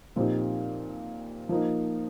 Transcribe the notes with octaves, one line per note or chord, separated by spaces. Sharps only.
A#2 F3 C4 D#4 G4
F3 A#3 D#4